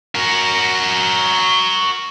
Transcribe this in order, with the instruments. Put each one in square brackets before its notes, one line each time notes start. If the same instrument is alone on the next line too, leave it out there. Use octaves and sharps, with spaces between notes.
[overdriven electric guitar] F#4 A#4